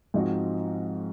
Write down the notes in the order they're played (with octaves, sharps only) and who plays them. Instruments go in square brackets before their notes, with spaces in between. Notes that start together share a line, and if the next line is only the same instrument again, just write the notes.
[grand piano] G#2 F3 C4 D#4 F#4